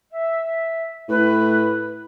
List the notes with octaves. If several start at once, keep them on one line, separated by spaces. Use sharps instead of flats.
E5
A2 B4